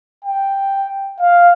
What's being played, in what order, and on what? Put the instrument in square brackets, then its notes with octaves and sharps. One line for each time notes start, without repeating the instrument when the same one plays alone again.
[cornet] G5
F5